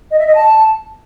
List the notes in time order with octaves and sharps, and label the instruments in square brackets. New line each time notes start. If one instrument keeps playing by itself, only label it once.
[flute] D#5
E5
D#5
A5